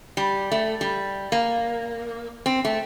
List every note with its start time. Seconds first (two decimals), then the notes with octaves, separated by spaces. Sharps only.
0.17 G3
0.52 A3
0.81 G3
1.32 A#3
2.46 C4
2.65 A3